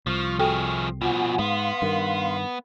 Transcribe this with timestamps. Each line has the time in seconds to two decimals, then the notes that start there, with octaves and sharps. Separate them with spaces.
0.07 C2 F3 C#6 F6
0.39 F3 F#4 G#4 A4 G5
1.01 B2 F3 F4 F#5 G#5
1.39 G#2 B3 F5 C6
1.82 G2 D#3 A#4